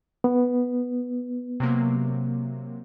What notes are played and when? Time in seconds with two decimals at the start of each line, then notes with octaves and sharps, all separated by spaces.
0.24 B3
1.60 C3 F#3 A#3